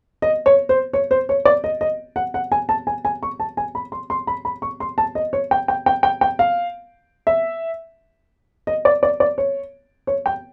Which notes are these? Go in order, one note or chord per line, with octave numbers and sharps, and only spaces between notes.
D#5
C#5
C5
C#5
C5
C#5
D5
D#5
D#5
F#5
F#5
G#5
A5
G#5
G#5
C#6
A5
G#5
B5
C6
C6
B5
B5
C#6
C6
A5
D#5
C#5
G5
G5
G5
G5
G5
F5
E5
D#5
D5
D5
D5
C#5
C#5
G5